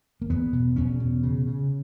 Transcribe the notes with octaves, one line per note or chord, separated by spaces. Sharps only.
A#3
E2 B3
B2
E2 C#4
B2
C#3
C#3